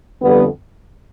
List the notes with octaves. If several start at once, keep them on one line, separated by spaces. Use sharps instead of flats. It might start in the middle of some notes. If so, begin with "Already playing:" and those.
F2 D3 G3 B3